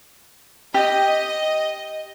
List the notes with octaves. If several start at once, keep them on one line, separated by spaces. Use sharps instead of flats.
G4 D#5